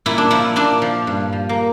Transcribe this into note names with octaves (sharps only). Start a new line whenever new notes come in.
A#2 E4
D4
F3 E4
A#2 D4
F3
G2
F3
A#3